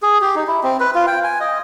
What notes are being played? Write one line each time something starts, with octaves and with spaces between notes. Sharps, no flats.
G#4
G4
D#4
E4
C4
B4
F4
G5
G#5
D#5